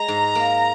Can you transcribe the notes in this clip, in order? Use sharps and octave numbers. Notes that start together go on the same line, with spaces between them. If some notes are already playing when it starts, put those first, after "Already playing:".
Already playing: G#3 A#5
G#2
A#3